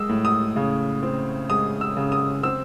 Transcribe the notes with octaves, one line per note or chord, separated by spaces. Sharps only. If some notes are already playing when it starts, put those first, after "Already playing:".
Already playing: G#3 D#6 E6
A2
D#6
C#3
C4
G#3 D#6
E6
C#3
D#6
C4 E6